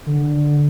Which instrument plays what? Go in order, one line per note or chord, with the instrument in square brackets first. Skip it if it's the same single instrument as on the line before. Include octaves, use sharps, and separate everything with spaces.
[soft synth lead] D3